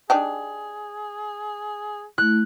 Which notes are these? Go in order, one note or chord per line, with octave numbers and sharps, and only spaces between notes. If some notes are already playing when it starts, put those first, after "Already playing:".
D4 D#4 G4 G#4
A3 E4 F#6